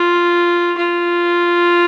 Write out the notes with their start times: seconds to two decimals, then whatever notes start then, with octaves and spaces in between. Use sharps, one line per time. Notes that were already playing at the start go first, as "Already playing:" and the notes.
Already playing: F4
0.78 F4